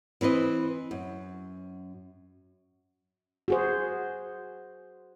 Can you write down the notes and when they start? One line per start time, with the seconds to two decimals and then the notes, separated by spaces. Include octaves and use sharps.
0.21 E3 C4 B4 D#5
0.91 F#2
3.48 F#4 G#4 C5